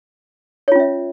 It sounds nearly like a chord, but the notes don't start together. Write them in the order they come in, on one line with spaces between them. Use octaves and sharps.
C#5 F4 C#4 E5